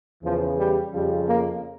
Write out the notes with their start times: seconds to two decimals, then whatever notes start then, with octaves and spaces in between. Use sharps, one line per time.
0.23 E2 C#3 E3 F3
0.58 G3
0.93 F2 C#3 F3 G3
1.28 A#3